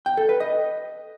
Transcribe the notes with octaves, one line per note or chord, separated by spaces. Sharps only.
G5
A4
B4
D#5